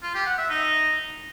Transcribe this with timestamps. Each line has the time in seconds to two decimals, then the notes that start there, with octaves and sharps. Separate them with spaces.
0.03 F4
0.14 G4
0.26 F#5
0.38 E5
0.50 D#4